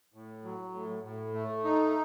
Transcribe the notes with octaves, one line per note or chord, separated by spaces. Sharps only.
A2
F#3
A2
A2
A3
D#4